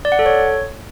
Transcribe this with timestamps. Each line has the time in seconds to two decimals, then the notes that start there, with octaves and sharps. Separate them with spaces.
0.05 D5
0.12 F#5
0.19 A4
0.26 C#5